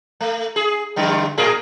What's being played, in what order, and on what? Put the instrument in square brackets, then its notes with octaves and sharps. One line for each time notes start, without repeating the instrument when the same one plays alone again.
[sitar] A3
G#4
G2 D3 G3
A2 G#4 A#4